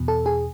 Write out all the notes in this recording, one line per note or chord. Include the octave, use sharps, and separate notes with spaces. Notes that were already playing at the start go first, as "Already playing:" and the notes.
Already playing: E2 B2
A4
G#4